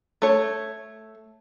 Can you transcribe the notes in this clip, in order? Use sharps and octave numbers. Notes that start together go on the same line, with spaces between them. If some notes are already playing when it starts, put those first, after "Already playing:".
A3 C#5